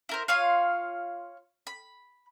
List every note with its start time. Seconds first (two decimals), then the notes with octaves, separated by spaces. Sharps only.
0.09 E4 A#4 C5
0.28 F4 C#5 F5 C6
1.67 B5